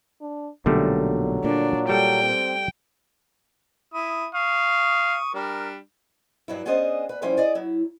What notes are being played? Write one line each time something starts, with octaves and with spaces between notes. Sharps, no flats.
D4
B1 A#2 D3 F#3 G3 A3
A#2 D4
G3 A4 G5
C4
E4 D#6
F5 C#6 D#6
G3 D4 A#4
G2 F#3 E4
B3 C#4 D4 G#4 C5 D#5
B4
F3 G3 C#4 E4 C5 D5
G#4 D5 D#5
F#3 E4